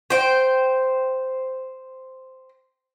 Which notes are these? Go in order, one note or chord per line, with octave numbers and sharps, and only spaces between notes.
C5 G5